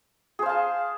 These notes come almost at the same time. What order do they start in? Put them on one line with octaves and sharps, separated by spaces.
G#4 C5 F5 A5